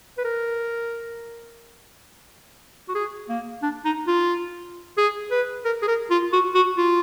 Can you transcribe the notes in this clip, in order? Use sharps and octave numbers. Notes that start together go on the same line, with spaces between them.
B4
A#4
F#4
G#4
A#3
D4
D#4
F4
G#4
B4
A#4
G#4
A#4
F4
F#4
F#4
F4